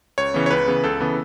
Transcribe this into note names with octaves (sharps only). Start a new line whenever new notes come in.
C#2 C#5
C#3 E3 B3
C#5
C#2 B4
C#3 E3 B3
C#2 A4
C#3 E3 B3